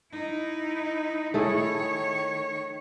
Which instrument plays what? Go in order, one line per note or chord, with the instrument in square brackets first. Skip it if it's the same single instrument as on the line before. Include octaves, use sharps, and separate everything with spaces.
[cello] D#4 E4
[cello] D#3 C#5 [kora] A3 E4 G#4